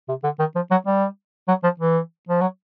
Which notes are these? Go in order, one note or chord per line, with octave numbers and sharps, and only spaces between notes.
C3
D3
D#3
F3
F#3
G3
F#3
F3
E3
F3
F#3